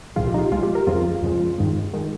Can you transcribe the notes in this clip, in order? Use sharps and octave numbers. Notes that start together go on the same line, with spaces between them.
C2 A#2 F3 G#3 F4
G4
D#4
F4
C2 A#2 F3 G#3 F4
G4
A#4
F2 C#3 F3 G#3 F4
F2 C#3 F3 G#3
G2 D#3 G#3
D#3 G#3